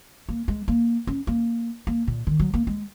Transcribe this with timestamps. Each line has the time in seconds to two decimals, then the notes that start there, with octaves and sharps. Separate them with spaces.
0.29 A#3
0.48 G#3
0.68 A#3
1.07 C#4
1.27 A#3
1.87 A#3
2.08 A#2
2.27 D#3
2.40 F#3
2.54 A#3
2.67 G#3